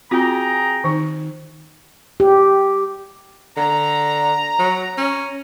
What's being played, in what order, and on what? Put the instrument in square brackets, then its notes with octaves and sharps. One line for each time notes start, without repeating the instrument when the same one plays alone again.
[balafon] C4 F4 F#4 [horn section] G#4 G5 A#5
[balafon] D#3 D#4
[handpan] G4
[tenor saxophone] D3 [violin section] A#5
[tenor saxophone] F#3
C#4